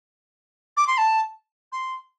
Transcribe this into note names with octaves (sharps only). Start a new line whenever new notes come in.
D6
C6
A5
C6